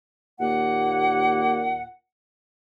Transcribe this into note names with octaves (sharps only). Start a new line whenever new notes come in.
D#2 A#2 A#3 F#5